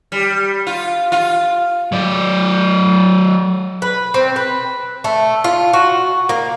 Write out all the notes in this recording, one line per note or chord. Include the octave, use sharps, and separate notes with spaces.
G3
F4
F4
F#3 D5
B4
C4
B4
A3
F4
F#4
A#3